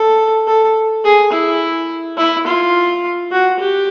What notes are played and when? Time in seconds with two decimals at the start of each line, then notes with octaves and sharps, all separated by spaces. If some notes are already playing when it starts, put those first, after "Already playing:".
Already playing: A4
0.47 A4
1.04 G#4
1.32 E4
2.17 E4
2.47 F4
3.32 F#4
3.59 G4